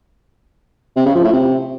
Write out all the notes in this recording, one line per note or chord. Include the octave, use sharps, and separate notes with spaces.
C3
C#3
F3
A2
C3